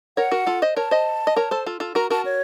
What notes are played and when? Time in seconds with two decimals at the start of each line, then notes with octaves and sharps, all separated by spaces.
0.17 A#4 C#5 F#5
0.31 F#4 A#4
0.47 F4 A4
0.62 C5 D#5
0.76 A#4 C#5 A5
0.91 C5 D#5
1.27 D#5
1.36 A#4 C#5
1.51 A4 C5
1.66 F4 A4
1.80 F4 A4
1.95 F#4 A#4 A#5
2.10 F#4 A#4 A5
2.25 C#5